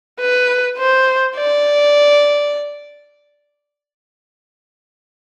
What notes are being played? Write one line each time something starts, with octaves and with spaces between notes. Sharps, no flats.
B4
C5
D5